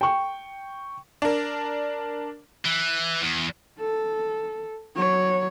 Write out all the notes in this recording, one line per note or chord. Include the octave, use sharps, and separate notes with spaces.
G5 C#6
D4 A#4
E3
E2
A4
F#3 C#5